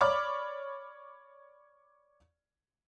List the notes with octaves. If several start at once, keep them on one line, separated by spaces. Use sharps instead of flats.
C#5 D5 B5 D6 F6